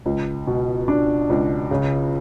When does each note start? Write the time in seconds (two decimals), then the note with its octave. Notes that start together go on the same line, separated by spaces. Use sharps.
0.06 C#2
0.47 B2
0.88 D4
1.30 C#2
1.71 C#3